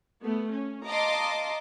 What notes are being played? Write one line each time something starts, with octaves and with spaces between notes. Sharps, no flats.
A3 B3
C#4
D#5 F5 A5 A#5 C6 D6